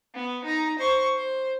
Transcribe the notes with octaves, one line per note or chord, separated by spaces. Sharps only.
B3
D#4 A#5
C5 C#6
C5